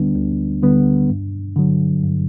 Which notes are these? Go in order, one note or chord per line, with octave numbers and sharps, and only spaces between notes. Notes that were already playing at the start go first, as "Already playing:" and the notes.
Already playing: D2 D3 G3 B3 D4
D2
D3 G3 B3
G2
D3 F#3
G2